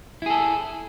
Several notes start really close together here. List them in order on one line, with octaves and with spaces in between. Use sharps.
E4 G#4 A4